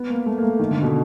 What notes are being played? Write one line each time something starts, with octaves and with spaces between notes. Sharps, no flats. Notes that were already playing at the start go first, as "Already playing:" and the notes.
Already playing: B3
A#3
A3
A#3
A3
D#3
D3
B2